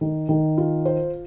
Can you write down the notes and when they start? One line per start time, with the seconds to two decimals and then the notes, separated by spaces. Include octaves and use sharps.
0.01 D#3
0.29 D#3
0.58 F4
0.85 C5